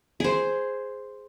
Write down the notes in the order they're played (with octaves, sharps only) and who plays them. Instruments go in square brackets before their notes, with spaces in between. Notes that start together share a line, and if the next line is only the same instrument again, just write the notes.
[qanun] G#4 C5